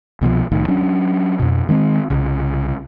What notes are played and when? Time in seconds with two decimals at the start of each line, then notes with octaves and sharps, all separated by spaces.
0.21 C2 B2 E3 F3
0.52 C2 A2 D#3
0.68 F#3 C#4 D4
1.39 F2 B2
1.69 D#3 G#3 B3 C4
2.10 C2 C#3